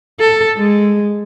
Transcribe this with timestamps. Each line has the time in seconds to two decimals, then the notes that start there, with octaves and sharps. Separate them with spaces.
0.20 A4
0.57 G#3